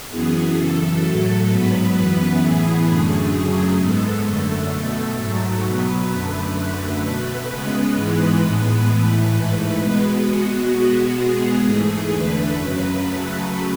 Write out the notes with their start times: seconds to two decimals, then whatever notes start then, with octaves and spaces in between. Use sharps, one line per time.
0.09 F#2 E3 B3 G#4
0.55 F#2 C#3 E3 A4
1.02 A2 F#3 A3
1.48 G#2 F#3 B3 B4
1.94 F#2 E3 B3 B4
2.40 A2 E3 B3 G#4
2.86 F#2 D3 A3
3.33 F#2 C#3 F#3 A3
3.79 G#2 G#3 B3 A4
4.25 F#2 D3 A3
4.71 B2 A3
5.17 G#2 F#3 A3
5.63 B2 F#3 B3 B4
6.09 F#2 D3 A3 B4
6.55 F#2 D3 A3
7.01 B2 A3 B4
7.48 C#3 G#3 B3
7.94 G#2 E3 G#3 B3
8.40 A2 G#3 B3 B4
8.86 A2 E3 A3
9.32 G#2 E3 A3 B4
9.78 B2 G#3 B3
10.24 B2 G#3 B3 F#4
10.70 B2 G#3 B3
11.17 B2 G#3 B3 G#4
11.63 G#2 E3 A3
12.09 E2 D3 A3 B4
12.55 F#2 C#3 F#3 B4
13.01 C#3 F#3 A3